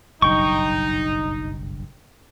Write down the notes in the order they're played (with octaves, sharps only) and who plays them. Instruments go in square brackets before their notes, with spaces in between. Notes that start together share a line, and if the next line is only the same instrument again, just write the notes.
[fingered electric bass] F#1 B1 G2 [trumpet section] D#4 [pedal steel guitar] G5 C#6